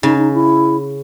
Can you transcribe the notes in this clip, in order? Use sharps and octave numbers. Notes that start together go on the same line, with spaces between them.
C#3 D#4
D#4
E4